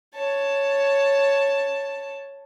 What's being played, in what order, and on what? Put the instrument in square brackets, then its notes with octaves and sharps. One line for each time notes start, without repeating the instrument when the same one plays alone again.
[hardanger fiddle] C#5 A5